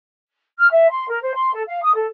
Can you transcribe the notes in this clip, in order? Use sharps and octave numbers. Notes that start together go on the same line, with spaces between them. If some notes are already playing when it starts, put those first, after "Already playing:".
F6
E5
C6
A#4
C5
C6
A4
F5
D#6
A4